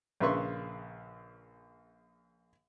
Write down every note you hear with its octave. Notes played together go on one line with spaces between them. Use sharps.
A#1 C#3 B4 E5 C6 C#6